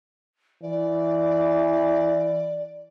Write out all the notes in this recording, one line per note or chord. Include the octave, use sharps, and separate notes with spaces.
E3 D5